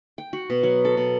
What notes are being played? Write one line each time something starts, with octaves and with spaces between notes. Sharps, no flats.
G5
F#4
B2
F#3
A4
B2